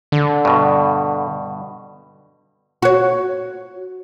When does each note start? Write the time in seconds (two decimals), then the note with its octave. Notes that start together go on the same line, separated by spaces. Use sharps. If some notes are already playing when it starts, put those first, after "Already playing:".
0.12 D3
0.45 G2 B2
2.82 F#4 C#5